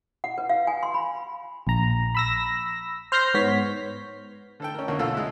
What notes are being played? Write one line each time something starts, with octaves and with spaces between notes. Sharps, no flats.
F#5
B4
F5
G#5
C6
B5
A#1 A#5
B5 E6 A#6
C5 F6 G6 A#6 C7
G#2 B3 C#5 B6
D3 A4 G5
C#4 A#4
D2 A#3 C#4 F#5
B1 D3 F4 A4 F5 E6
G#3 E4